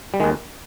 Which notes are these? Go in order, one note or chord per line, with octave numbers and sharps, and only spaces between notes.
G3
D#2 D#3 G#3